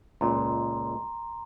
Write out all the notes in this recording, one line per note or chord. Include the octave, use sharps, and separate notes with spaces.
C#2 A#2 A#5 C6